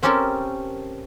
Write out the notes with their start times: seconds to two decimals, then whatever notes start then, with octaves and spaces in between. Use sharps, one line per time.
0.03 C4 C#4 G4 A4 A#4